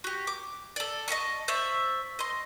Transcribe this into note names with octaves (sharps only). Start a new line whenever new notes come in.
F#4 G4
D6
A4 D5
D#5 E5 A5 C#6
C5 D5 E5 C#6
D#5 C6